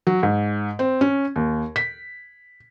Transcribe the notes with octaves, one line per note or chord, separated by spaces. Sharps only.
F#3
G#2
C4
C#4
D#2
B6